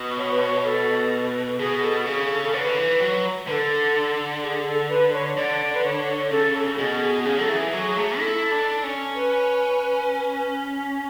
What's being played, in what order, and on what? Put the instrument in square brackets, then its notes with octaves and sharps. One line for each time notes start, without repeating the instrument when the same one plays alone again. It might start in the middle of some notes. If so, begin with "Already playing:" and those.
Already playing: [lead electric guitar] B2
[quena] C#5
B4
C#5
A4
[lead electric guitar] B2 [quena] G#4
[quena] A4
[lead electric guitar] C#3 [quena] G#4
[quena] A4
A4
[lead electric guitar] D3 [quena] C#5
[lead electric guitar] C#3 [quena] B4
[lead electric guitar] D3
E3
F#3
[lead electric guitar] D3 [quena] B4
[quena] A4
G#4
A4
B4
C#5
[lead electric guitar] D3 [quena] D5
[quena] B4
C#5
[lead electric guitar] C#3 [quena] A4
[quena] A4
[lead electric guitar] B2 [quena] G#4
[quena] G#4
[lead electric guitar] C#3 [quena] G#4
[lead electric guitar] F#3 [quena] A4
[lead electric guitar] E3 [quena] G#4
[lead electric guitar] F#3
A3
[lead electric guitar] E4 [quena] A4
[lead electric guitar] D4
C#4
[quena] B4